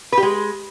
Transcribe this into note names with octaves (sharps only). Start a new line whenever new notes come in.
B4
G4
G#3